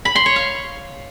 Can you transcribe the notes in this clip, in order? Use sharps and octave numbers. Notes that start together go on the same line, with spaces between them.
B5
C6
C#5
F5